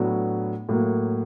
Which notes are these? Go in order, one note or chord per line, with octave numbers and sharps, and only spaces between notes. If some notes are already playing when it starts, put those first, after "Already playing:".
Already playing: A2 F#3 B3 D4
A2 F#3 A#3